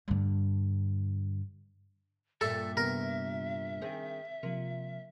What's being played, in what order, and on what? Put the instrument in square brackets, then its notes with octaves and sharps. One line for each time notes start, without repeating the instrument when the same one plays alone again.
[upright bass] G2 D3
[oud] G2 A#2 [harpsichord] A4 [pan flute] E5
[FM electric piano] C3 B3 [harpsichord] A#4
[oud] D#3 C4 G#4
[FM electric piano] C3 F3 [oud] A#3